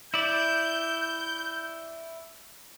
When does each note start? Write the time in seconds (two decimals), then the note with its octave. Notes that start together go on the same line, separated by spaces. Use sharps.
0.14 E4 D5 G6